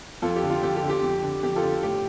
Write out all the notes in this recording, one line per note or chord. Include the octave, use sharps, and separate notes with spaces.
F2 F4 A4
G4
D3
F4
F2 G4
G4
D3
G4
F2
D3
F2 G4
F4 A4
D3
A2 G4